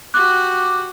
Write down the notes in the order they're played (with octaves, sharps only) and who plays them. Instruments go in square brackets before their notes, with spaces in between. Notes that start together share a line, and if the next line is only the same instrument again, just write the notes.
[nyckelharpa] F#4 G4 [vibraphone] D6 [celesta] F#6